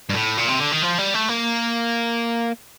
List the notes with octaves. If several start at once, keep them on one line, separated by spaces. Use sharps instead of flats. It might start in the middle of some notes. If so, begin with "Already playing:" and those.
G2
A2
A#2
C3
D3
D#3
F3
G3
A3
A#3